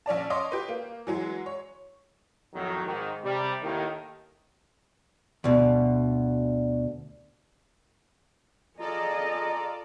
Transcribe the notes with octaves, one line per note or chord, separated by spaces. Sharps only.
A#1 C#4 D5 A5
C#5 D#5 C6 D6
G4 B4
A#3
E3 F#3 G#3
C#5
F2 A2 D#3 F#3
G#2 D#3
C3 G3
D#2 A2 D#3
D2 B2
F4 G#4 A4 D5 D#5 A#5